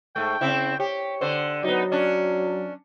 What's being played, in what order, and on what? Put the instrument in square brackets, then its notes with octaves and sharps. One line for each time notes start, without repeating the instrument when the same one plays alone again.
[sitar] G#2 A3 [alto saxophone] G5
[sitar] C#3 C4 E4
[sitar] G4 [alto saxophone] C#5
[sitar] D3 C5
[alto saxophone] F#3 [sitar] B3 D#4
[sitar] C#4 D4